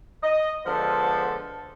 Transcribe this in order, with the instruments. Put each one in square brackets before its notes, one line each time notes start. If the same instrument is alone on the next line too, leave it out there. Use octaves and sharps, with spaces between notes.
[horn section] D#5
D3 F3 G#3 B3 A4 C5